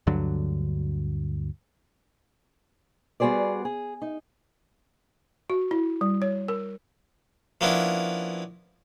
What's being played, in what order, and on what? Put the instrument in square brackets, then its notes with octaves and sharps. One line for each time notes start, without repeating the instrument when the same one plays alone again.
[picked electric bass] D2 G2 D3 F#3
[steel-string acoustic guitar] G3 B3 F#4 G#4 C5 D5
G#4
D#4
[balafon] F#4
E4
G3
C#5
A#4
[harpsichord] F3 A#3 B3 C#4 D4 E4